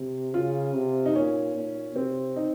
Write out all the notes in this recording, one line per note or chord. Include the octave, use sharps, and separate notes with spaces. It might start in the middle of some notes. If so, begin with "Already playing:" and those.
Already playing: C3
C#3 F4
C3
D#4
A#2 C#4
A#2
C3 C4
D#4